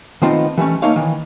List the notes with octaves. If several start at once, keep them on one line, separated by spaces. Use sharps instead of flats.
D#3 A3 B3 C4 D#4 F4
E3 G3 A3 C#4
A3 A#3 D#4 C#5 F5
D#3 E3